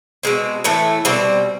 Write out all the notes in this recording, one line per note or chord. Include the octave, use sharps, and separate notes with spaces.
B2 G#3 C4
A2 E3 A3
B2 G3 C4